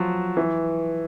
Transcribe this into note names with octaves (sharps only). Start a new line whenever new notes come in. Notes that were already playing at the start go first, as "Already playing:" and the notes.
Already playing: F3 F#3
E3